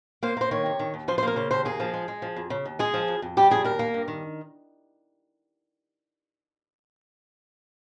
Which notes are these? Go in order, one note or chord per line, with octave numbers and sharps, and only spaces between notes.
A#3 C5
A#3 C5
D#3 C#5
C3
D#3
D#2
F3 C5
C5
A#3 A#4
C#3 C5
D#2 C5
A#3 G#4
F3
G#3
G#3
F3
F2
C#3
D#2
G#3 G#4
F3
F2
F2
G3 G4
F2 G#4
D#2 A#4
A#3
G2
D#3